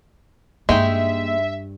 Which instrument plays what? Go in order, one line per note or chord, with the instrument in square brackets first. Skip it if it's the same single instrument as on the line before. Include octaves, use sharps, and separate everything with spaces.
[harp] G2 [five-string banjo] G#3 D#4 G5 [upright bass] A#3 [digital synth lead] E5